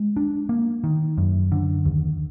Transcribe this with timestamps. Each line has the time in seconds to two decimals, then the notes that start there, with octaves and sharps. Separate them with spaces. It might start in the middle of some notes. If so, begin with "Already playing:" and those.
Already playing: G#3
0.17 D4
0.49 A#3
0.84 D#3
1.18 F#2
1.52 D3
1.85 D#2